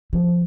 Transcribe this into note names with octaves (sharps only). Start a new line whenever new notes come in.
F3